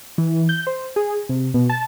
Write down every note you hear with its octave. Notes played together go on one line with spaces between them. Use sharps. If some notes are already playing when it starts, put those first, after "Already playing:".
E3
G6
C5
G#4
C3
B2
A5